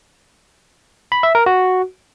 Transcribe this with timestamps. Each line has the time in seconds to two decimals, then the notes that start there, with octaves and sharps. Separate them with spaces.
1.12 B5
1.23 E5
1.35 A#4
1.46 F#4